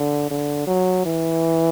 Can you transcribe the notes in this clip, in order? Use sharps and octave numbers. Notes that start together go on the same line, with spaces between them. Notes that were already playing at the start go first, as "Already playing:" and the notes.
Already playing: D3
D3
F#3
E3